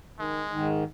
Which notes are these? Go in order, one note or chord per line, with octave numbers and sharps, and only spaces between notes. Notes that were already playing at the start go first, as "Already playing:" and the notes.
D#3 G#3
G#2 D#3 D#4